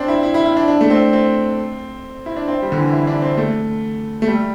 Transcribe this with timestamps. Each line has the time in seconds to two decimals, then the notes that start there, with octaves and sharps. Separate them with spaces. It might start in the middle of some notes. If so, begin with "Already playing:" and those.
Already playing: C4 D4
0.08 E4
0.23 E4
0.34 E4
0.46 E4
0.57 D4
0.68 D4
0.81 A3
0.90 C4
1.13 C4
2.26 E4
2.37 D4
2.48 C4
2.62 G3
2.72 D3
2.77 E3
2.92 E4
3.07 D4
3.22 C4
3.37 A3
4.22 A3
4.28 G3